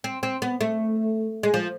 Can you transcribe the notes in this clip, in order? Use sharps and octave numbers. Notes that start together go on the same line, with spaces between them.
C4
C4
B3
A3
G#3
F3